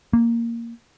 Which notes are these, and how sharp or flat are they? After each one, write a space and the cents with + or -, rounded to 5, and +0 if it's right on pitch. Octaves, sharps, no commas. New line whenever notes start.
A#3 -5